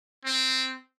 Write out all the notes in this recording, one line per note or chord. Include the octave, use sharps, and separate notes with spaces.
C4